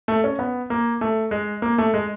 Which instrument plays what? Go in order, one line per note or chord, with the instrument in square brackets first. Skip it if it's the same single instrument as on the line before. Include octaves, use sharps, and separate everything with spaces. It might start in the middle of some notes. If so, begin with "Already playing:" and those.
[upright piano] A3
C#4
B3
A#3
A3
G#3
A#3
A3
G#3